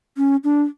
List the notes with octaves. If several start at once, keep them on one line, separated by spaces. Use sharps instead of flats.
C#4
D4